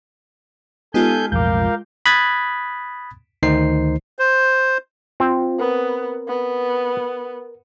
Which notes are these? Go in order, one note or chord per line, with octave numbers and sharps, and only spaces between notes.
G#3 B3 D#4 F4 G4 A4 G#5 G6
B1 F2 A2 A#4 F5 D6 G6
B5 D#6 F#6 G#6 A6 B6
D2 D#3 D#4 C5 C7
C5
C4 F4
B3 A#4
B3